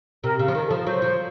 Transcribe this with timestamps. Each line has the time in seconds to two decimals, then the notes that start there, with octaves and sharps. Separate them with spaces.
0.24 C3 A#4
0.39 C#3
0.48 F3
0.55 D#3 A#4
0.66 A4
0.71 F3
0.77 A#4
0.86 F#3 C5
1.02 F3